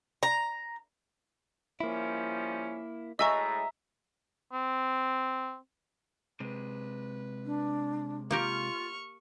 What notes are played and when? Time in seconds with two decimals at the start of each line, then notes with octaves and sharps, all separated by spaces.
0.23 A#5
1.81 F3 G3 A#3 C#4 E4
3.19 A2 G#3 D#5 E5 G#5 A#5 C#6
4.53 C4
6.40 C3 G#3 B4
7.46 D4
8.31 A#3 F4 G4 A#4 C#6 F6